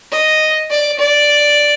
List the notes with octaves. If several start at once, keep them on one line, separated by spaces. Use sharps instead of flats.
D#5
D5
D5